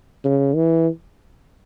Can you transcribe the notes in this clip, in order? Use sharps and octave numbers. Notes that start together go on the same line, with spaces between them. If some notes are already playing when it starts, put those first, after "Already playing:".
C#3
E3